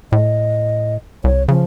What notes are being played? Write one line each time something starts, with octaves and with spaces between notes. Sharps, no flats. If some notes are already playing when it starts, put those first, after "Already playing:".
A2 D#5
C2 C#5
C#3 F3